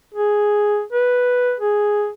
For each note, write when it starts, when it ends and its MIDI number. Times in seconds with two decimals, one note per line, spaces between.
0.14 0.82 68
0.93 1.54 71
1.60 2.09 68